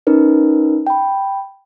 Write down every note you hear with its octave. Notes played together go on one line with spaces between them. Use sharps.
C#4 D#4 A#4 B4
G5 B5